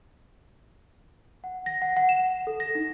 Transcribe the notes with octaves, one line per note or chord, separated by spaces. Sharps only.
F#5
A#6
F#5
F#5
E7
A4
A#6
D#4